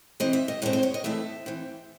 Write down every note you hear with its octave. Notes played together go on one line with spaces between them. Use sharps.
C3 E3 C4 D#5
E5
D#5
A2 G#3 C4 C#5
C5
C#5
D#5
E3 A3 C4 E5
E3 C4